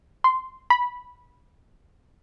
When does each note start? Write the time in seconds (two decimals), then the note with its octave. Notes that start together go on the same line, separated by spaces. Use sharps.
0.24 C6
0.70 B5